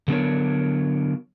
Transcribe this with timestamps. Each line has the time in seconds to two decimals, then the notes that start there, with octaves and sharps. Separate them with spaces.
0.08 D3 F#3 B3 D4 A#4 C#5